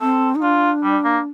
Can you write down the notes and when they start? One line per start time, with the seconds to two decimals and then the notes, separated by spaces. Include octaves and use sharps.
0.01 C4 A4
0.35 D#4
0.42 D4 F4
0.83 G3
1.04 A#3